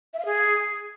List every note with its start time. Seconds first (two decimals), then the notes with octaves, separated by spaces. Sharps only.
0.14 E5
0.19 F5
0.25 G#4